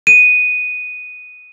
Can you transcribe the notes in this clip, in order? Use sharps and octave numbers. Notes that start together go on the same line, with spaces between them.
D#7